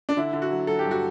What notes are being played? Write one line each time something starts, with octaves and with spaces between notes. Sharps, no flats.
D4
D3 E4
D3
F#4
F#3
F#3 A4
G4
G2
F#4